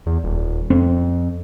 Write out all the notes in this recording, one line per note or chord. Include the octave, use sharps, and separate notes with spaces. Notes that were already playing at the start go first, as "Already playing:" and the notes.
E2
D#1
F2 C4